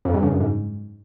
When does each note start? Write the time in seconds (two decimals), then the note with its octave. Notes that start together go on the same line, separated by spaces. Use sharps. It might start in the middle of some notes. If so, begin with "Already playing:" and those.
0.05 F2
0.14 G2
0.23 C#3
0.32 F#2
0.40 G#2